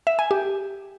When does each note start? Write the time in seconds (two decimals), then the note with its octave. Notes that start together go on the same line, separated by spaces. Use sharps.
0.07 E5
0.19 G#5
0.31 G4